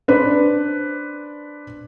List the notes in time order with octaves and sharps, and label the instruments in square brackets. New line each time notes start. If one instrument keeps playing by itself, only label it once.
[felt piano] D4 B4 C5